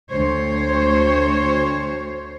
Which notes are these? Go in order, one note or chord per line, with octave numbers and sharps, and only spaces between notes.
D2 C5 C#5